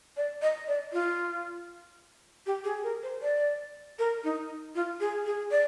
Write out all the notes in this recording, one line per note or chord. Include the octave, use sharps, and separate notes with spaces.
D5
D#5
D5
F4
G4
G#4
A#4
C5
D5
A#4
D#4
F4
G#4
G#4
D5